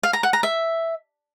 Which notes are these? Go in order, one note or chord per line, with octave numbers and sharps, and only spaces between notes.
F5
A#5
F#5
A#5
E5